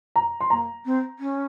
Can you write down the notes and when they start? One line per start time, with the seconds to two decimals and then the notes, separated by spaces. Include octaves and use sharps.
0.16 A#5
0.41 C6
0.50 A#3 A#5
0.85 C4
1.19 C#4